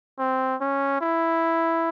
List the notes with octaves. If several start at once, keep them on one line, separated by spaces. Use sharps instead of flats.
C4
C#4
E4